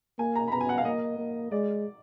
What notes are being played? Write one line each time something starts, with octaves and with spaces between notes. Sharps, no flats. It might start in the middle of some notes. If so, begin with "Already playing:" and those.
A#3 G#5
A#5
B5
B3 A#5
G#5
F#5
F5
A#3 D#5
A#3
G#3 D5